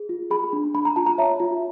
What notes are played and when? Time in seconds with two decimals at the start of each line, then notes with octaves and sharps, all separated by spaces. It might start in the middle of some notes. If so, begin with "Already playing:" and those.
Already playing: G#4
0.09 F4
0.31 G#4 B5
0.53 D4
0.75 D4 B5
0.85 A#5
0.96 F4 A5
1.06 A#5
1.18 C#5 E5
1.40 F4